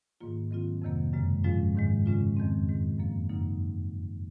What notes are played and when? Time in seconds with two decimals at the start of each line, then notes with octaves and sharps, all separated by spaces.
0.21 G#2 D#3 A#3 F4
0.51 D#3 F#3 C4 F4
0.82 F2 C3 D#3 F#3 A#3
1.13 F#2 C#3 G#3
1.44 G#2 F3 G#3 C#4 F4
1.75 G#2 D#3 G#3
2.06 C#3 G#3 C#4 F4
2.37 F2 D#3 G#3 C4
2.68 G#2 D#3 G#3
2.98 F#2 F3 A#3
3.29 F#2 C#3 F#3 A#3 D#4